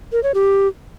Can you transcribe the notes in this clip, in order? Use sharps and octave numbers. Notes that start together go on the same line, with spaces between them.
A#4
C#5
G4